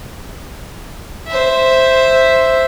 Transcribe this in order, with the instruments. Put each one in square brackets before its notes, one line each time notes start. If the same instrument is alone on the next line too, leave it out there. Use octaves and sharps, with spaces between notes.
[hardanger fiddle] C5 E5